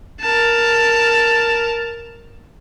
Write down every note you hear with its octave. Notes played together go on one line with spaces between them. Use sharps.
A#4 A5